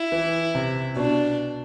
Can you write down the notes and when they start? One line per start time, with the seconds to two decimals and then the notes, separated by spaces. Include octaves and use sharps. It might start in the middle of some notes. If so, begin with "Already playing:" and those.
Already playing: E4
0.12 E3
0.55 C3
0.96 B2 D4